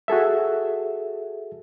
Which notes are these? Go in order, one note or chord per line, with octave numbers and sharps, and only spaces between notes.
F#4 G#4 A4 E5